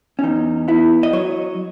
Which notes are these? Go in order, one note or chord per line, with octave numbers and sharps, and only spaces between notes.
C#4
E2 D#4
B3 E4
D#5
F#3 C#5